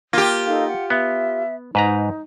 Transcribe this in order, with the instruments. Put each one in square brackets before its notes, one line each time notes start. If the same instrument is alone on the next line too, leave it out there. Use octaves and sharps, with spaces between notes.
[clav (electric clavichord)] A#3 [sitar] F4 G4
[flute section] D#4 A4 F5
F#5
[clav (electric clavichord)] B3 [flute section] E5
[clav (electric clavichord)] G#2 B4 A#5 [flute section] D#4